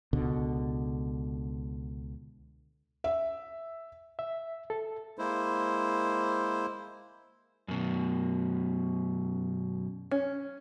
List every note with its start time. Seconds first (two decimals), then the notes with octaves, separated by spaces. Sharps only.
0.13 C#2 B2 D3
3.04 E5
4.19 E5
4.70 A4
5.19 G#3 A#3 E4 C5
7.68 F#2 B2
10.11 C#4